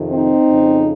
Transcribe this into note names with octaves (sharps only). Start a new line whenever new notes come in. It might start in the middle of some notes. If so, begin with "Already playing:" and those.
Already playing: F2 C3 D#3
C4 D#4
F2 C#3